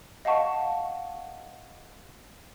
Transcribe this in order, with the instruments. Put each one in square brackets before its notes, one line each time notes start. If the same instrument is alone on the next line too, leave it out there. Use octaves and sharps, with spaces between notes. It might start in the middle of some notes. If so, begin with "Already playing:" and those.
[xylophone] D#5 F5 F#5 A5 C#6